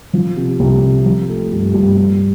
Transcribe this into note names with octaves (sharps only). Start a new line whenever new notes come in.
F3
C3
C2
C3
F3
A3
G2
G2
G2